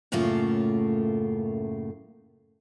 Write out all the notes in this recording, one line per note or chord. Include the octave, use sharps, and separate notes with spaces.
F#2 A2 C#3 A3 A#3 F4